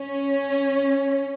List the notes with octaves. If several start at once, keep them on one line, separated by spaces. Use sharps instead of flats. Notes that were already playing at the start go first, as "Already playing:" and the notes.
Already playing: C#4